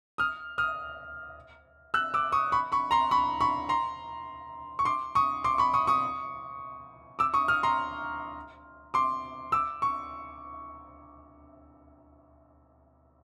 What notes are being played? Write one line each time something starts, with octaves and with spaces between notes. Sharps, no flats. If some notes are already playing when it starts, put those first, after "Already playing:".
D#6 F6
D#6 F6
E6 F#6
D6 E6
C#6 D#6
B5 C#6
B5 C#6
A#5 C6
B5 C#6
B5 C#6
A#5 C6
C#6
C6 D6
C#6 D#6
C6 D6
B5 C#6
C#6 D#6
C#6 D#6
D6 E6
C#6 D#6
D#6 F6
A#5 C6
C6 D6
D6 E6
C#6